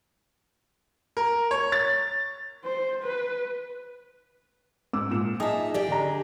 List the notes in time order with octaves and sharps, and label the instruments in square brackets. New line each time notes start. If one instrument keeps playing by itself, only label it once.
[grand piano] A#4
C#5
A6
[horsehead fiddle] C5
B4
[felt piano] G#2 D6 E6
A#2 E7
[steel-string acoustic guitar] D#4 E5 [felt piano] G#4 D#5 A5
[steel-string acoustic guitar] G4 G#4 [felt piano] D5
[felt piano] D3 D4 A#5